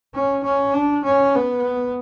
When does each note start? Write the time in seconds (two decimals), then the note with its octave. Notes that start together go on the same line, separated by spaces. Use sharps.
0.14 C#4
0.44 C#4
0.73 D4
1.04 C#4
1.35 B3